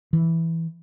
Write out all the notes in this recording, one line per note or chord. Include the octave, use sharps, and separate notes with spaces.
E3